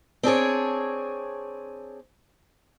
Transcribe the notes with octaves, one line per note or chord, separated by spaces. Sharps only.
C4 D4 G#4 C#5